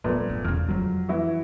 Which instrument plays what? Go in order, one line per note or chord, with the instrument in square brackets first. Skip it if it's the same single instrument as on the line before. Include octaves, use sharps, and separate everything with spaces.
[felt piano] A#2 A3 B3 [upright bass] F3 G3
[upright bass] G2
[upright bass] E2 C#3 [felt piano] F6
[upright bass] F2 F3 [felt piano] F#3
[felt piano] E3 E4 F#4